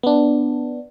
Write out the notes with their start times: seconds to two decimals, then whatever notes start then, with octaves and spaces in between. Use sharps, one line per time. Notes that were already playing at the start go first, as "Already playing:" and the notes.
0.03 B3 D4